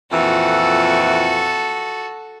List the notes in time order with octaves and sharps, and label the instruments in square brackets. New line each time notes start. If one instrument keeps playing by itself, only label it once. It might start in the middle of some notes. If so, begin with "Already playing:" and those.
[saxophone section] F2 A#2 E3 [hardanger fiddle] F#4 A4